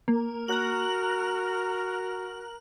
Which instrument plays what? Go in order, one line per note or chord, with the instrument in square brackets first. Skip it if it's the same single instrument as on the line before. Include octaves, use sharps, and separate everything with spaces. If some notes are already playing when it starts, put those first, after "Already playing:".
[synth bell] A#3
[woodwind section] F#4 A#4 [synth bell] A#5 F#6 F#7